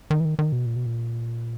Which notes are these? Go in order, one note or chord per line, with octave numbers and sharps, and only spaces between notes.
D#3
E3
D#3
D#3
B2
A#2
B2
A#2